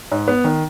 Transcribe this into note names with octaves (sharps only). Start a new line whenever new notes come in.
G#2
B3
D#3